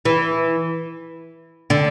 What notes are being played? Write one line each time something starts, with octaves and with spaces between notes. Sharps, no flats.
E3
D3